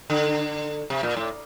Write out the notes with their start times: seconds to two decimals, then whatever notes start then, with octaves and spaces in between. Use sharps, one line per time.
0.10 D3
0.90 C3
1.03 A#2
1.17 A2